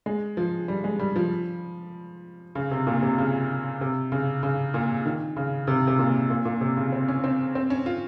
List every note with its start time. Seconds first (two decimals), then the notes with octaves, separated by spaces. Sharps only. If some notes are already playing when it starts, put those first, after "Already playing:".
0.06 G#3
0.37 F3
0.68 G3
0.84 G#3
0.99 G3
1.16 F3
2.55 C#3
2.71 C3
2.87 A#2
3.02 C3
3.18 C#3
3.81 C3
4.12 C#3
4.43 C#3
4.74 A#2
5.05 D#3
5.36 C#3
5.67 C3
5.87 C3
5.99 A#2
6.30 A#2
6.45 A#2
6.61 C3
6.77 C#3
6.92 C4
7.08 C#4
7.24 C4
7.55 C4
7.70 C#4
7.86 F4